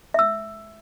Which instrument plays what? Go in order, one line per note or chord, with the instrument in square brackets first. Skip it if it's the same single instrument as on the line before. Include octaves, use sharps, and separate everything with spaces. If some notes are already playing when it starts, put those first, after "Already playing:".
[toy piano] E5 E6